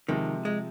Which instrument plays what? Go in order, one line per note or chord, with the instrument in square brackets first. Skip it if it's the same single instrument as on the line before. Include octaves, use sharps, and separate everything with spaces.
[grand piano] C3 F3 G#3 [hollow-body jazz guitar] D#3
[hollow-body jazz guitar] G#3